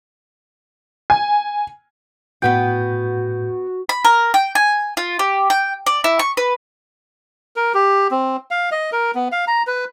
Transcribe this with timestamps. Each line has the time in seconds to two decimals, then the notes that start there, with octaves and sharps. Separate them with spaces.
1.10 G#5
2.42 A2 B3 F#4 B4 F#5 G5 G6
3.89 B5
4.04 A#4
4.34 G5
4.55 G#5
4.97 F4
5.19 G4
5.50 G5
5.86 D5
6.04 E4
6.19 C#6
6.37 B4
7.56 A#4
7.74 G4
8.11 C4
8.51 F5
8.72 D#5
8.92 A#4
9.15 B3
9.32 F5
9.47 A#5
9.67 B4